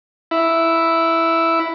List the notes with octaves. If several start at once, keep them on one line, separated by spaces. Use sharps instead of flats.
E4